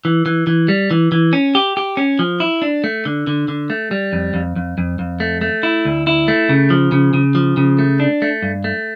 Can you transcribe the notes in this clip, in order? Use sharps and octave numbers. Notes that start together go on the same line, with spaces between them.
E3
E3
E3
G3
E3
E3
C#4
G4
G4
C#4
F3
E4
D4
A3
D3
D3
D3
A3
G3
F2
F2
F2
F2
F2
A3
A3
E4
D2
E4
A3
C#3
F3
C#3
C#3
F3
C#3
A3
D4
A3
G2
A3